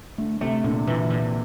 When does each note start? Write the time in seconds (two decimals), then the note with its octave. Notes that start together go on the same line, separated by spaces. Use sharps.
0.18 D3 A3
0.41 C3 A3
0.64 A#2 D3
0.87 A#2 E3
1.10 A#2